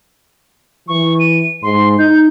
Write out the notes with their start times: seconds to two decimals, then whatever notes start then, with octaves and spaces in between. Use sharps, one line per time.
0.88 E3 C#6
1.20 D#7
1.63 G#2 C6
1.99 D#4 G6